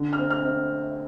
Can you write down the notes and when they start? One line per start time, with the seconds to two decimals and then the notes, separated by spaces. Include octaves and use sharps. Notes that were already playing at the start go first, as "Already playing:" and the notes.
Already playing: D3
0.13 F6
0.18 C4
0.30 F6
0.44 C4